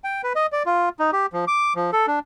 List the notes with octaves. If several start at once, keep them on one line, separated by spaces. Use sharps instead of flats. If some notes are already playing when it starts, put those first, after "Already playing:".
G5
B4
D#5
D5
F4
D#4
G4
F3
D6
F3
A4
D4